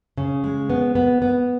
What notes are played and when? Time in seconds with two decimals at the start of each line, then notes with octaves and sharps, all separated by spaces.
0.17 C#3
0.44 G#3
0.70 B3
0.95 B3
1.22 B3